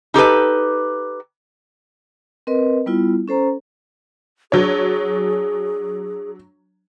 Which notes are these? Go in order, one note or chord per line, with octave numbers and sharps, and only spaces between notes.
D#4 G4 A4 B4
C4 A#4 B4 D#5
G3 B3 E4 F4
C#4 A4 C5 A#5
F#3 D4 G#4 C#5